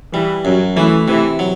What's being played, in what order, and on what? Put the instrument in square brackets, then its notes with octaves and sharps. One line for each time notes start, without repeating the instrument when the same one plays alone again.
[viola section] E3 [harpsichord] G3
[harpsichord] F#2 [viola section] F#3
[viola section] E3 [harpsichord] A3
[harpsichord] C3 [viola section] E3
[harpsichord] F#3